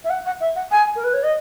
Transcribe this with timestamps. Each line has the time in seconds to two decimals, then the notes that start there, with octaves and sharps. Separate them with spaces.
0.04 E5
0.09 F#5
0.25 F#5
0.40 E5
0.55 F#5
0.71 G#5
0.95 A#4
1.03 B4
1.13 C#5
1.23 D#5